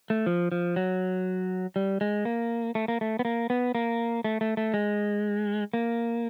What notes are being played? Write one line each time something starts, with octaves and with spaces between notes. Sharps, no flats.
A3
F3
F3
F#3
G3
G#3
A#3
A3
A#3
A3
B3
A#3
B3
A#3
A3
A3
A3
G#3
A#3